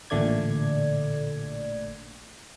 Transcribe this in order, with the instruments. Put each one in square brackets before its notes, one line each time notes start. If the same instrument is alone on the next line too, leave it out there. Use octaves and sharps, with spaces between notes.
[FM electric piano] A1 A#2 D3 A3 D5 G#6